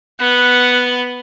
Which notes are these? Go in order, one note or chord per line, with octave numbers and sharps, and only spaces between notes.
B3 F#5